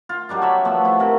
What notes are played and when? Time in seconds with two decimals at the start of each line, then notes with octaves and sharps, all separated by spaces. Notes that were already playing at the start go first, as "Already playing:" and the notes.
0.09 F4
0.29 F#3 G3 D4 D#4
0.42 C#5 E5 B5
0.65 F3 A3 B3
0.85 E4
1.00 C3 A#4